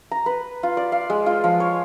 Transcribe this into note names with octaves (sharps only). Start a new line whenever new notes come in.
A#5
B4
F4
D5
F5
G#3
F4
F3
C#5